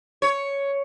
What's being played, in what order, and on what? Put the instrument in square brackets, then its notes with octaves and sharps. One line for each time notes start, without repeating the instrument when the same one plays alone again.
[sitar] C#5